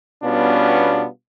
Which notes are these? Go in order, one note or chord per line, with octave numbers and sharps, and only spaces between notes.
B2 G3 B3 C#4 D4 F4